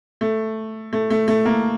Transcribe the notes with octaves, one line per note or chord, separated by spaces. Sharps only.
A3
A3
A3
A3
A#3